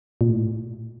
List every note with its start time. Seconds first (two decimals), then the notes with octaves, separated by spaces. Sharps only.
0.21 A#2
0.30 A2